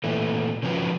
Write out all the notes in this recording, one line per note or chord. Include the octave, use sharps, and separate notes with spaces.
A#2 E3 A3
C#3 F3 F#3 C#4 F4 B4